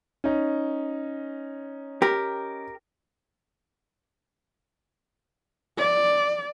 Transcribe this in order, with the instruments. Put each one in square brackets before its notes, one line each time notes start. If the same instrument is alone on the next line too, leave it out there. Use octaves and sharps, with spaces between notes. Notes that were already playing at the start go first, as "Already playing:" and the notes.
[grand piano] C#4 D#4
[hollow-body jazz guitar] G4 A#4
[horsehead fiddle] D5